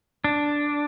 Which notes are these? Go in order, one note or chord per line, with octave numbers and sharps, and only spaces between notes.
D4